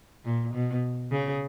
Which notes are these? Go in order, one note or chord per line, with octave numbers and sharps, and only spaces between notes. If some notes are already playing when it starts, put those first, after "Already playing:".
A#2
B2
C#3